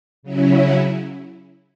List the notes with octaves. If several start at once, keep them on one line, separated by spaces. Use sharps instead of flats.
C#3 F#3 C#4 E4